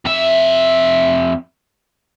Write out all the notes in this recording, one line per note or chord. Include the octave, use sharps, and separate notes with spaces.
F2 E5